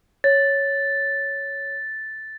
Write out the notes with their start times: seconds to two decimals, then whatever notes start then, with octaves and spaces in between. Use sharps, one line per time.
0.24 C#5 A6